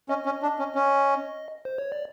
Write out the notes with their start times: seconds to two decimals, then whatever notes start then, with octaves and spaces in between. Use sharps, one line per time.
0.09 C#4 D#5
0.25 C#4
0.43 D4
0.59 C#4
0.75 C#4
1.65 C5
1.78 C#5
1.92 D5